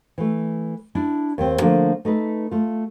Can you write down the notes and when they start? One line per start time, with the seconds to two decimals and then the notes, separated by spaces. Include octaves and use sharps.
0.18 E3 A3
0.95 D4 E4 A5
1.38 D#2 C4
1.61 D3 F3 A3 A#3 D4
2.05 A3 D#4 A4 B4
2.51 A3 F4